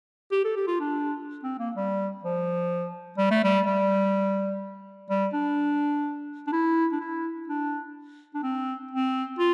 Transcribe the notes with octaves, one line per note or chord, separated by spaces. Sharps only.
G4
A4
G4
F4
D4
C4
A#3
G3
F3
G3
A3
G3
G3
G3
D4
D4
E4
D4
E4
D4
D4
C4
C4
F4